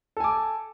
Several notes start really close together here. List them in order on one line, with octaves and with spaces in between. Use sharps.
A4 G#5 D6